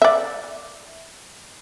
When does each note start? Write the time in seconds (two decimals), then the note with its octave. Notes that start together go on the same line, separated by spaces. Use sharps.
0.02 D5 E5